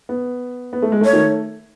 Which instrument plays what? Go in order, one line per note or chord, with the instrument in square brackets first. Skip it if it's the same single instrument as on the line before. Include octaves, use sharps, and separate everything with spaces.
[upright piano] B3
B3
A3
G#3
[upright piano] A3 [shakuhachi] C#5
[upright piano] D#3